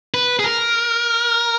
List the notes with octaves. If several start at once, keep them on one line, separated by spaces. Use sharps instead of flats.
B4
G#4
A#4